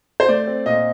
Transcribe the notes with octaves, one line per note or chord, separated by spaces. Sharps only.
C5
A3 D5
C4
A#2 D#5